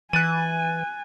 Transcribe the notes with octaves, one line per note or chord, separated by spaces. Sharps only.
E3 G#5 F#6 A6 D#7